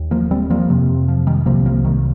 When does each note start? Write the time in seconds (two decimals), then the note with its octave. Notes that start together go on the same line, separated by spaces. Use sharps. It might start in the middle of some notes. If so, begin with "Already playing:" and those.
Already playing: D#2
0.11 F3 A#3
0.31 G3 C4
0.50 F3 A#3
0.69 F2 C3
1.08 F3
1.27 D#3 G3
1.46 C2 C3 F3 A#3
1.66 F3 A#3
1.85 D#3 G3